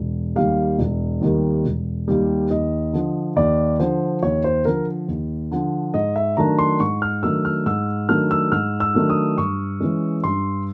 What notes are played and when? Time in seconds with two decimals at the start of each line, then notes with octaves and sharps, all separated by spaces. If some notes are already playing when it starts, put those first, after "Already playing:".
Already playing: E1
0.36 D#2 D#3 G3 F5
0.79 E1
1.21 D#2 D#3 G3
1.65 E1
2.08 D#2 D#3 G3
2.51 D#2 D#5
2.93 D3 F3
3.36 D#2 D5
3.80 D3 F3 C5
4.22 D#2 C#5
4.44 C5
4.65 D3 F3 A#4
5.08 D#2
5.51 D3 F3
5.94 G#2 D#5
6.16 E5
6.37 D#3 F#3 A3 D4 A#5
6.59 C6
6.80 G#2 C#6
7.02 F6
7.23 D#3 F#3 A3 D4 E6
7.45 F6
7.66 G#2 E6
8.09 D#3 F#3 A3 D4 F6
8.31 E6
8.52 G#2 F6
8.80 E6
8.94 D#3 F#3 A3 D4
9.10 D#6
9.38 G2 C#6
9.80 E3 G#3 C#4
10.24 G2 C6